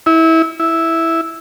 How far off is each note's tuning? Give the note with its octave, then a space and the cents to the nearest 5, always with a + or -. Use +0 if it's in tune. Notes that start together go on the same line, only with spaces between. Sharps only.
E4 -25
E4 -5